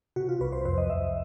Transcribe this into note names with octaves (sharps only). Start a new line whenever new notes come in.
C3 F#4
F4
C2 B4
C5
F2 C5
D#5
F2 E5